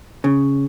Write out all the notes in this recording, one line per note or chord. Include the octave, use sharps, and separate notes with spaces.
C#3